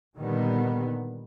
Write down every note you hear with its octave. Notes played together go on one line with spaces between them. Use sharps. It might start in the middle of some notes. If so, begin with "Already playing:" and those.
A#2 D3 D#3 G3 B3